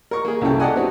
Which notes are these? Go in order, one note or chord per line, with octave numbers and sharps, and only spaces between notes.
A#4 C#6
A#3 G#4
C2 F#2 C#3 E4 A4 G5
G4 A4 D5 D#5 F#5 G#5
B3 C4 D#4 F#4